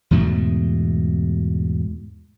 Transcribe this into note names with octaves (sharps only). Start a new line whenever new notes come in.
E2 G#2 B2 A3